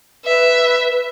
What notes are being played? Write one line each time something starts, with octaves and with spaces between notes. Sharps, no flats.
B4 E5